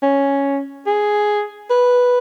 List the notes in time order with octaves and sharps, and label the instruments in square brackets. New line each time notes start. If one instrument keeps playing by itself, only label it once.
[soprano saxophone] C#4
G#4
B4